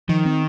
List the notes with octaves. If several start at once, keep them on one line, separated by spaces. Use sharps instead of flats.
D#3 F3
C4